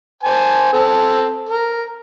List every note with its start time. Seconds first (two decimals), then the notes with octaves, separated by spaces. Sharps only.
0.23 C5 G#5 A5
0.73 C4 A4
1.49 A#4